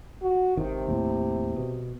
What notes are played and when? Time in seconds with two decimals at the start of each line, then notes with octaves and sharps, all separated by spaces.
0.22 F#4
0.57 G#1 C3 D#3
0.87 D#2 A2
1.56 B2